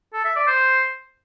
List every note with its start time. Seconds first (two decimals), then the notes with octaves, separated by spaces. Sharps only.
0.14 A4
0.25 E5
0.36 D5
0.47 C5